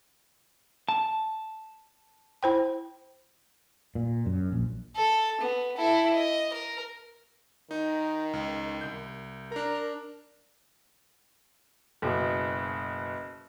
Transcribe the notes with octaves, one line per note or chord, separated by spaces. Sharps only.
A5
E4 C5 G5
A#2
F#2
A#1
A4
B3
E4 A4
D#5
A#4
D#3 D#4
C#2
C2 G6
D4 A#4 A#5
F#1 B2